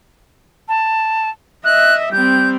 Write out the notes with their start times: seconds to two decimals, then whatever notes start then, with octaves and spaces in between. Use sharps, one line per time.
0.69 A5
1.65 D#5 E5 F#6
2.12 G3 C4 G6